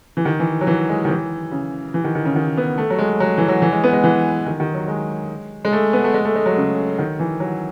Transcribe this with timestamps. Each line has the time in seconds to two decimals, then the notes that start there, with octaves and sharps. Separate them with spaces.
0.17 E3
0.25 D#3
0.39 E3
0.61 F#3
0.67 E3
0.89 G#3
1.05 D#3
1.10 E3
1.51 C#3
1.94 E3
2.04 D#3
2.15 D#3
2.25 C#3
2.36 D#3
2.57 B3
2.78 A3
2.90 F#3
2.98 G#3
3.20 F#3
3.38 E3
3.48 F#3
3.62 E3
3.72 G#3
3.84 B3
3.93 G#3
4.04 E3
4.46 D#3
4.60 D#3
4.74 F#3
4.88 G#3
5.65 G#3
5.72 A3
5.93 B3
6.04 A3
6.14 G#3
6.25 A3
6.35 G#3
6.46 F#3
6.56 C#3
6.99 D#3
7.19 E3
7.40 F#3